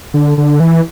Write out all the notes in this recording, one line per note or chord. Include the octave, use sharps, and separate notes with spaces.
D3
D3
E3